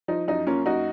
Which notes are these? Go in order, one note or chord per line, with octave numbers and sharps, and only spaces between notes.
F3 D#4
F#2 D#4
A#3 C#4 F4
F#2 D#4 F#4